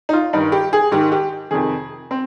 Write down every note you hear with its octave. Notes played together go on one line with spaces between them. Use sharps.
D#4
F4
G2 D#3 D#4
G4
G#4
G#2 D#3 G4
G4
F2 C3 D#3 G#4
C4